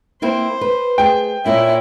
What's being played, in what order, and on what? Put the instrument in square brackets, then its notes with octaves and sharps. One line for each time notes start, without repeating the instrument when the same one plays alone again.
[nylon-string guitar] A#3 C4 E4 [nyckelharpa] C5
[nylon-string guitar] B4
[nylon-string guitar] A3 G#4 [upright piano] G5
[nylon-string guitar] A#2 A#3 C#4 [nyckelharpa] E4 [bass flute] E5